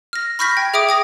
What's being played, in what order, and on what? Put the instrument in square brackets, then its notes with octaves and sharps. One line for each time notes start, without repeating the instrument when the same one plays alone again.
[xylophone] F6 A#6
B5 C#6 F6 G6 A#6 B6
G5 G#6
G#4 E5 G5 D6 D#6 D7
G5 D#6 A#6